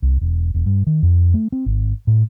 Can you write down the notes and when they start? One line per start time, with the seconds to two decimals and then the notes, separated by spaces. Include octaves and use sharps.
0.02 C2
0.21 E1
0.54 E1
0.66 G2
0.87 D#3
1.03 F2
1.34 A3
1.52 C4
1.66 G#1
2.07 A2